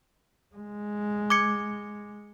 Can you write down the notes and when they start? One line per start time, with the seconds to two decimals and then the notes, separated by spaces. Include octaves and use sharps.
0.55 G#3
1.30 D6 G#6 C#7